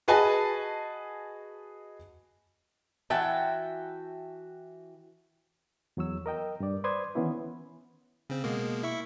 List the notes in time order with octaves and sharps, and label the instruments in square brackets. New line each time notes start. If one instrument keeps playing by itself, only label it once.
[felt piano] F#4 G#4 B4 D#5 G#5 A5
[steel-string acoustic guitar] E3 F#4 E5 G5 A5
[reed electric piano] E2 F#3 C#5 E6
A#4 D#5 G5
G2 D5
B4 C5 D5 C6 D#6 G#6
D#3 E3 B3 C#4 E4
[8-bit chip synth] C#3 C4
B2 G#3 A#3
E4 E5 C#6